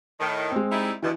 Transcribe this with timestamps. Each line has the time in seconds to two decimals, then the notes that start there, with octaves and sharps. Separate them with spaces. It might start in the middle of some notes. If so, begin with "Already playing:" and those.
0.20 A2 D#3
0.52 G#3 C4
0.71 G3 D#4 E4
1.02 G2 B2 E3